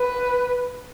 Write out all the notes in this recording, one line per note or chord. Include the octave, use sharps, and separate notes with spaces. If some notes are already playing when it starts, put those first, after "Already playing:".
Already playing: B4